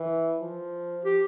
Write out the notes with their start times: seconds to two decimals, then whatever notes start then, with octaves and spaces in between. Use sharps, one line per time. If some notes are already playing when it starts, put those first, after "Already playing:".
Already playing: E3
0.41 F3
1.05 G4